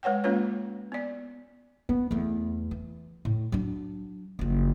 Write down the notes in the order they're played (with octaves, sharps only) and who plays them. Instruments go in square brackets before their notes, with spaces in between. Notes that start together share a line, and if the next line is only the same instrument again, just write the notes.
[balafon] G#3 B4 C#5 F#5 G5
G#3 A#3 C#4 F4 B4 C#5
B3 D5
[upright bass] B3
E2 A3
E3
A2
F#3 D4
F#1 F3